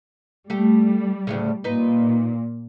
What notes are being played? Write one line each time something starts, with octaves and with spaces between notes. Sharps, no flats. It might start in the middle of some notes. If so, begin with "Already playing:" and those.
G3 A3 G4
D2 A2 C#3
A#2 D#4 B4